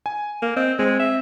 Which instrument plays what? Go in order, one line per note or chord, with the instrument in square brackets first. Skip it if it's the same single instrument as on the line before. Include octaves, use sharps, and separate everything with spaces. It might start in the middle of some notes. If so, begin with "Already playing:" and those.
[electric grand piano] G#5
[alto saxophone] A#3
[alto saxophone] C4 [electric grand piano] D#5
[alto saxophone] G#3 [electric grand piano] C4 C5
[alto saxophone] E5